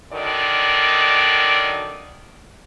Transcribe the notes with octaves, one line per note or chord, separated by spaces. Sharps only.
F#2 D3 D#3 D5